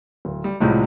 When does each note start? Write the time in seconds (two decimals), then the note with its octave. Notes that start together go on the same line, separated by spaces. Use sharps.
0.25 D1
0.44 G3
0.60 C2 A2 C3 F3 G3 G#3